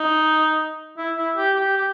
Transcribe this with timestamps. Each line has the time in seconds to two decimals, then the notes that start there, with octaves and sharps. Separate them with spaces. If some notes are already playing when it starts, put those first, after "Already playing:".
Already playing: D#4
0.98 E4
1.17 E4
1.36 G4
1.55 G4
1.77 G4